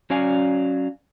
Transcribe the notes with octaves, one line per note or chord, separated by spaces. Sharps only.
F#3 C#4 D5 F5 G#5